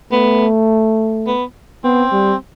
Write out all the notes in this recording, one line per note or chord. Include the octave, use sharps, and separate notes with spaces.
A3 B3
B3
B3 C4
G3